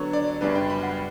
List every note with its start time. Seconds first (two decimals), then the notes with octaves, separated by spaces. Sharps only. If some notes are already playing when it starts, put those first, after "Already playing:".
Already playing: D3 F#3 B3 D4 C#5
0.13 D5
0.41 F#2 C#3 G3 B3 D4 B4
0.55 G5
0.70 B5
0.83 F#5